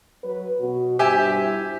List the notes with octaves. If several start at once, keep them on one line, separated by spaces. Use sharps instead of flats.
F#3 B4
B2 F#4
G2 G4 C5 E5 G#5
E4